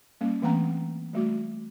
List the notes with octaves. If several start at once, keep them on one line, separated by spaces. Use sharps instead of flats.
G3 A#3 C#4
E3 A3 A#3 C4 F#5 A#5
G3 A3 F#4